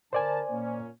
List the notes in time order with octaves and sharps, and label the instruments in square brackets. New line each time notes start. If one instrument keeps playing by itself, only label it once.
[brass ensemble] D3 A#4 A5 [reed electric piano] C5 D5 G#5
[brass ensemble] A#2 A#3 C#4